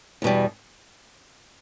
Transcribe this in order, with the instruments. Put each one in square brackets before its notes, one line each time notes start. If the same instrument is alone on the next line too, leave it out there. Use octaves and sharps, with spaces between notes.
[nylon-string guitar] E2 B2 G3